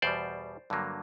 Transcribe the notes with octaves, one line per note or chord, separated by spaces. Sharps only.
E2 B2 G3 C5 D5
G2 D3 F#3 A#3